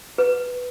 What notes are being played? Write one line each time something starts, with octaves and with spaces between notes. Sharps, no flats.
B4